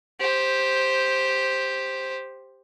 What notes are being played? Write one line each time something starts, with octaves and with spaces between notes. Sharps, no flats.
G4 C5